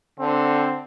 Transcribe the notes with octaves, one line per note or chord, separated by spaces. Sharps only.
D3 C4